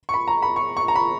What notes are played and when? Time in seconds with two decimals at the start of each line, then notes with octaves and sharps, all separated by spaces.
0.09 C#6
0.14 B5
0.28 A#5
0.42 B5
0.56 C#6
0.77 C#6
0.88 A#5
0.96 B5